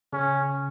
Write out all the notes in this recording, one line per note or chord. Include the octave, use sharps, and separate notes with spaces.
C#3 C#4